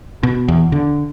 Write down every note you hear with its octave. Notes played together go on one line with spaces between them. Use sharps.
B2
E2
D3